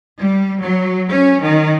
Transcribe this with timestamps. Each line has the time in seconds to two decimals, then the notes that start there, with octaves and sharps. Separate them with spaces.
0.19 G3
0.60 F#3
1.10 C#4
1.42 D#3